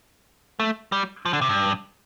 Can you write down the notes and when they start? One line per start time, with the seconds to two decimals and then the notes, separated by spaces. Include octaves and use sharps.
0.60 A3
0.92 G3
1.26 F3
1.33 D3
1.41 C3
1.49 G2